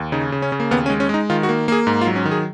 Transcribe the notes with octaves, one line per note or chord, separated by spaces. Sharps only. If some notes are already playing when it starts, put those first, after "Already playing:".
Already playing: D#2
C#3 D#4
C#3
C#4
C#3
A#3
D#2 B3
C#4
G#3
C#4
G#3 D#4
D#3 F4
F#4
A#3
A#3 G#4
G#2
F4
F#3
C#4
D#3
G#4